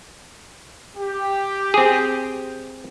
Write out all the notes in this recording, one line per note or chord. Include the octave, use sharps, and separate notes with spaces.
G4
C4 G#4